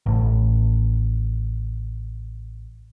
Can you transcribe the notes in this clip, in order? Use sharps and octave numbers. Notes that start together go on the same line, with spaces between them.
A1 A2